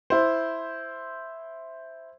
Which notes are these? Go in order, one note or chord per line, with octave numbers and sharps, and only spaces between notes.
E4 C5